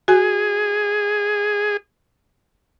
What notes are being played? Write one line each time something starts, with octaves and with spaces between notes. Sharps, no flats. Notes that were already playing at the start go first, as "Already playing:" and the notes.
F#4 G#4 G#5